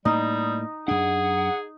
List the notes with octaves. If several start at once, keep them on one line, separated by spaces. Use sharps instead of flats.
A2 G3 A#3 D#4
F#2 D4 G#4 F#5